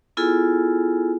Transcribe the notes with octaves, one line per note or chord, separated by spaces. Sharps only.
B3 E4 F4 G#4 A4 G#5